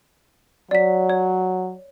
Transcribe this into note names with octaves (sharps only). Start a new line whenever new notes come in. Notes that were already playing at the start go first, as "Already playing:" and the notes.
F#3 D5 B6
C#5